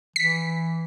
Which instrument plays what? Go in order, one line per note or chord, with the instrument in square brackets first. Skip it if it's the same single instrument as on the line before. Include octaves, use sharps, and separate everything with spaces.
[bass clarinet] E3 [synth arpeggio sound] B6